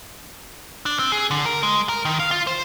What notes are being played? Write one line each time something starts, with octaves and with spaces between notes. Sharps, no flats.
D4
C4
G#4
D3
A#4
G#3
A#4
D#3
F5
F4
C5